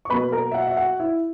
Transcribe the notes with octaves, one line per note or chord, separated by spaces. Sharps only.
C#6
B2 F#3 A#3 B4 B5
A#4 A#5
E5
F#4 F#5
E5
F#4 F#5
E4 E5